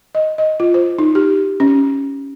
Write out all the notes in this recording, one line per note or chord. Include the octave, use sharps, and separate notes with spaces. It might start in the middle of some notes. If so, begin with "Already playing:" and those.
D#5
D#5
F4
C5
D#4
G4
C#4